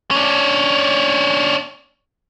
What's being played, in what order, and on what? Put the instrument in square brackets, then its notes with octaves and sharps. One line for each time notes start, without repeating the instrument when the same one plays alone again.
[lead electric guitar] C#4 D4